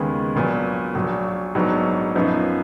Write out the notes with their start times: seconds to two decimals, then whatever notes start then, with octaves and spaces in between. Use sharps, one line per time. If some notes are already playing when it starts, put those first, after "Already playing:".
Already playing: D#2 C#3 G#3 B3
0.35 A#1 A#2 F#3 B3
0.95 A#1 A#2 F#3
1.55 A#1 G#2 F#3 B3
2.15 F#2 F3 B3 D#4